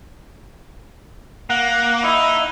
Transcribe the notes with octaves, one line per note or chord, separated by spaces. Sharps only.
A#3 F#5
D#4 E4